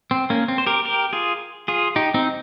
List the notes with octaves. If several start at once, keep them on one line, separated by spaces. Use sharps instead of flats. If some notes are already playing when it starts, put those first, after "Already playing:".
C4
A#3 C#4
C4
C5
G4 A#4
G4 A#4
F4 G#4
F4 G#4
D#4 G4
C4 D#4